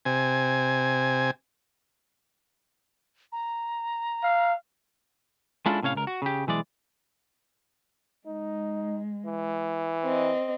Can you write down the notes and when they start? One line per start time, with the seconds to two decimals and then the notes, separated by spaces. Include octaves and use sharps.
0.05 C3 G#5
3.32 A#5
4.23 F5
5.66 G#3 C#4 D4 E4 F4 A4
5.83 A2 C3 C#4 C#5 F5
5.95 C#2 A#4
6.07 F#4
6.22 C#3 G4
6.47 B1 E3 G#3 D5
8.27 G#3 D#4
9.26 E3
10.04 C4 D#5